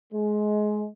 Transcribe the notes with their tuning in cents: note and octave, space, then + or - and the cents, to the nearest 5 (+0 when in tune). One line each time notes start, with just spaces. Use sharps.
G#3 +20